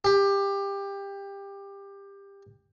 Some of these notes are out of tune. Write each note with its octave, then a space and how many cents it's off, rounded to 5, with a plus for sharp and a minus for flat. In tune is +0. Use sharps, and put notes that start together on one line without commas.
G4 +20